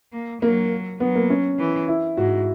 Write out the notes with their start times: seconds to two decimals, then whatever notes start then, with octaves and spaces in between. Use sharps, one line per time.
0.12 A#3
0.42 F#3 A#3
1.00 F#3 B3
1.15 A#3
1.30 C#4
1.59 E3
1.88 E4
2.17 G#2 F#4